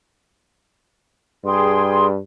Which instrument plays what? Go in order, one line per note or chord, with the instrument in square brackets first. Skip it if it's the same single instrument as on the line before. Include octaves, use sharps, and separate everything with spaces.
[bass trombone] G2 [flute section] G#4 G5 C6